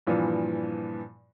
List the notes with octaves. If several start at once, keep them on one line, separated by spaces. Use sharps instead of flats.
G2 A#2 E3 F3